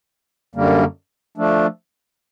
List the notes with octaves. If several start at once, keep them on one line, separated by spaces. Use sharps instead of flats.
F#2 D3 G3 A#3
F3 A3 D4